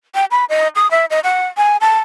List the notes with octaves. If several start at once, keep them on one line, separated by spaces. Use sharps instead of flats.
G5
B5
D#5
D#6
E5
D#5
F#5
G#5
A5